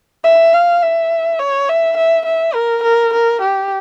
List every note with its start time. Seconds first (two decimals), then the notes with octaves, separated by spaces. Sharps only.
0.24 E5
0.54 F5
0.82 E5
1.39 C#5
1.69 E5
1.97 E5
2.25 E5
2.54 A#4
2.83 A#4
3.13 A#4
3.41 G4